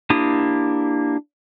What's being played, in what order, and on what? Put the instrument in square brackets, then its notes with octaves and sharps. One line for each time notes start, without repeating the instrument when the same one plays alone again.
[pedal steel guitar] A#3 D4 E4 G4 D#6